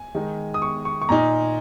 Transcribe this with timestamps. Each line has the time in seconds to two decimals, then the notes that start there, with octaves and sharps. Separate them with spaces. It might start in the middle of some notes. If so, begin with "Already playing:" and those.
Already playing: G#5
0.15 D#3 G#3 D#4
0.54 D#6
0.62 C#6
0.85 C#6
1.01 C#6
1.09 A#2 A#3 D#4 A#5